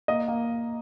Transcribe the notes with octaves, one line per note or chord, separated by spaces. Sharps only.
A#3 D#5
A#3